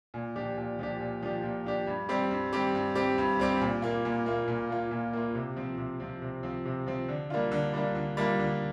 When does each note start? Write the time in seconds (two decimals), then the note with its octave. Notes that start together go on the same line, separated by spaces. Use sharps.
0.14 A#2
0.36 F3 D4 G4
0.57 A#2
0.79 F3 D4 G4
1.00 A#2
1.22 F3 D4 G4
1.44 A#2
1.65 F3 D4 G4
1.87 G2
2.09 G3 C4 G4
2.31 G2
2.53 G3 C4 G4
2.75 G2
2.95 G3 C4 G4
3.18 G2
3.40 G3 C4 G4
3.61 A#2
3.82 A#3 F4
4.05 A#2
4.26 A#3 F4
4.48 A#2
4.70 A#3 F4
4.91 A#2
5.13 A#3 F4
5.35 C3
5.57 F3 C4
5.78 C3
6.00 F3 C4
6.22 C3
6.43 F3 C4
6.65 C3
6.87 F3 C4
7.08 D3
7.30 G3 A#3 D4 F4
7.52 D3
7.74 G3 A#3 D4 F4
7.95 D3
8.17 G3 A#3 D4 F4
8.39 D3